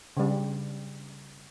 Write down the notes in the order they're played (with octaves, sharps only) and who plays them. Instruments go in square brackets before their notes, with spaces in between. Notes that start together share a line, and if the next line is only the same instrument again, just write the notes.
[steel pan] C#3 G3